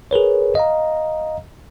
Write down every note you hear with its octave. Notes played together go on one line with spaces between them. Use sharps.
G#4 A#4 B4 C#5
D#5 F5 A#5